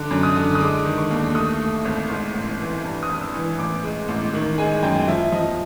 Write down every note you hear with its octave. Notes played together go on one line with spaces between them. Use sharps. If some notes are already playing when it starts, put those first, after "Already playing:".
Already playing: D3 D6
F#2
D#6
D3
D#6
G#3 D6
D#3
C#6
D#2
A3 D#6
A3
G#1
G#2
A1
E3
G2
D#6
G#1
E6
E3
A1 D6
G#3
A1
D#3
G#3 G#5
F#2 G5
F3 E5
F3 D#5